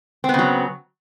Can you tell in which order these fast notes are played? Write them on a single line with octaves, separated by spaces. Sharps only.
C4 B3 C#3 F#3